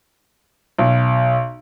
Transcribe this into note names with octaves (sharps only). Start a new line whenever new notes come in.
B1